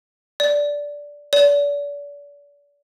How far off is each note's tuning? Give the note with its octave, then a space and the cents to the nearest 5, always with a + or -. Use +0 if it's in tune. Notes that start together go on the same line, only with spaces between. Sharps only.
D5 -10
D5 -35